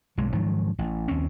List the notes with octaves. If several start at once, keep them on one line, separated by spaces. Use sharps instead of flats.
B1 G2 G#3
G#2 D#3 F3 F#3
A1
D#2 C4 C#4